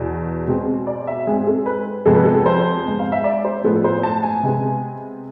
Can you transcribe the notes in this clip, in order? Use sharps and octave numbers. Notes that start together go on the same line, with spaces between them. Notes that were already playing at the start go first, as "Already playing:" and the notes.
Already playing: E2 B2
B2 G#3 C4
D5
E5
G#2 G#3 C4 G#4
A4
B4
F2 C3 G#3 B3 A4
B4
A4
C5
G#2 G#3 B3
F5
E5
D5
C5
A2 F3 G#3 B3 A4
C5
A5
G#5
C3 G#3 B3